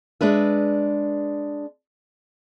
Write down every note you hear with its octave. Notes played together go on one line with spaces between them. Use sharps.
G#3 D4 B4 E5